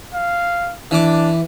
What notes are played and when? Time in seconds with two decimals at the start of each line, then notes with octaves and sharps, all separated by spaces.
0.14 F5
0.91 E3 D4 D6